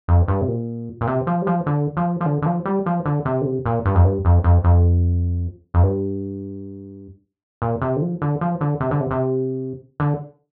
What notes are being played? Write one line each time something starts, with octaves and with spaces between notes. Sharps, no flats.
F2
G2
C3
A#2
A#2
C3
F3
G3
F3
D3
F3
F3
D3
D3
F3
G3
F3
D3
C3
D3
C3
A#2
G2
F2
G2
F2
F2
F2
F2
G2
A#2
C3
D3
F3
D3
F3
D3
C3
D3
C3
C3
D3